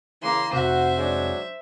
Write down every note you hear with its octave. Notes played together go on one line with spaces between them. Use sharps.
C#3 E3 A#3 C6
F1 C3 F#4 C5 E5
F#3 G#3 D4